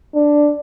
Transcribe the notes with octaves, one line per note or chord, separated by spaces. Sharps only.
D4